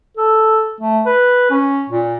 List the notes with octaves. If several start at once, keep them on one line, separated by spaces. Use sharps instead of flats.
A4
A3
B4
C#4
A#2